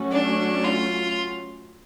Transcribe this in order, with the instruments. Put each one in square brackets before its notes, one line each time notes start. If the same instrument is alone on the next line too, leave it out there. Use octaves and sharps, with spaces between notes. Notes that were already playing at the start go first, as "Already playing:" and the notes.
Already playing: [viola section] F#3 A3 C#4 F#4
[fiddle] D4
F4